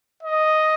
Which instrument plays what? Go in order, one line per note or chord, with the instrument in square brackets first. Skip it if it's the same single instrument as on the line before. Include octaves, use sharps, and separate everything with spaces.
[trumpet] D#5